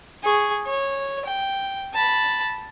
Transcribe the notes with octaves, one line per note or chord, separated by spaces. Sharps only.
G#4 C#6
C#5
G5
A5 B5